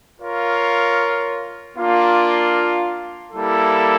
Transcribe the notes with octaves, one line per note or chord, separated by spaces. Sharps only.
F4 A#4 C#5 F5
A#3 D4 F4
G3 A#3 E4 A4